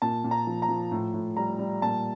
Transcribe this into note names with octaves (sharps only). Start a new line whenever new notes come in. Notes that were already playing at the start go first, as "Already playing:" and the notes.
A#2 A5
A#2
A#5
F3
A#5
F3
A2
A2
G3 A#5
G3
A#2 A5